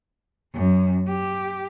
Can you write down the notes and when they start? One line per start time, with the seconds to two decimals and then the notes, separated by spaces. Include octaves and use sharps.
0.54 F#2
1.08 G4